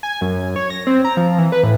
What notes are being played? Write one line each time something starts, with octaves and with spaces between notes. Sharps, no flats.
G#5
F#2
C#5
A#6
C4
A#5
F3
E3
B4
A2